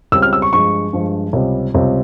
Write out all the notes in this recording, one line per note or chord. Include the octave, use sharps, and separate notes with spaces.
C#2 C#3 G3 C4 E6
F6
E6
C#6
G2 F3 G#3 C#6
G2 F3 G#3
C#2 C3 G3 C4
C#2 C3 G3 C4